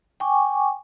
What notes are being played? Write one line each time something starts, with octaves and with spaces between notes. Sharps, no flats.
G5 G#5 C#6 D6